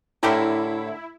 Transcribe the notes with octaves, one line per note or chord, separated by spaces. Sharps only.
A2 D3 E4 G4 A#4